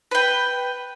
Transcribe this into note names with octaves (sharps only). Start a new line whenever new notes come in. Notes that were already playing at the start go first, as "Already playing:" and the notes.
B4 G5